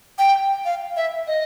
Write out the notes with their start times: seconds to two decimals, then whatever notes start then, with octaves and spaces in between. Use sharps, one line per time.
0.19 G5
0.65 F5
0.96 E5
1.27 D#5